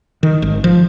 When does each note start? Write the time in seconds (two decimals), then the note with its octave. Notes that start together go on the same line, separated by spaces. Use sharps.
0.23 D#3
0.42 G#1
0.64 F3